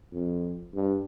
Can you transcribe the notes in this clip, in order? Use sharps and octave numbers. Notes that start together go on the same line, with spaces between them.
F2
G2